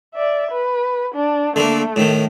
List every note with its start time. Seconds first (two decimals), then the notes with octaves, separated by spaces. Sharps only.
0.14 D5 E5
0.51 B4
1.14 D4
1.56 D3 A3 A#3
1.96 A2 D#3